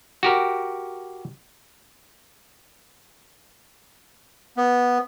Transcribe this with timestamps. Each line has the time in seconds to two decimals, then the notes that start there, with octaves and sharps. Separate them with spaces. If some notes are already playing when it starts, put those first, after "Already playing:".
0.23 F#4 G4 A#4
4.57 B3